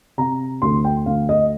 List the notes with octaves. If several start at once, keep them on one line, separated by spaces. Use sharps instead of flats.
C3 A#5
D2 C6
G5
D2 F5
D#5